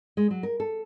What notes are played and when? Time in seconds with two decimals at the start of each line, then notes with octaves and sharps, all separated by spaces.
0.17 G#3
0.31 F#3
0.43 A#4
0.60 A4